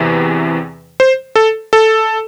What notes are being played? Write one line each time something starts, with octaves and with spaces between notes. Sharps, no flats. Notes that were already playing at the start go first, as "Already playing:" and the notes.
Already playing: E2 C3 E3
C5
A4
A4